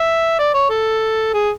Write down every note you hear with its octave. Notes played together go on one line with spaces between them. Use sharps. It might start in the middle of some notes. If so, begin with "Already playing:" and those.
Already playing: E5
D5
C#5
A4
G#4